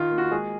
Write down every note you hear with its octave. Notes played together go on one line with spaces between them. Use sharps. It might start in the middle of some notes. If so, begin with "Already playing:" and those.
Already playing: D#3 F4
A#3
F#4
G#3 G#4